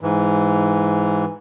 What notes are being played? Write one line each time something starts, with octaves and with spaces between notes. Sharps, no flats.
G#2 E3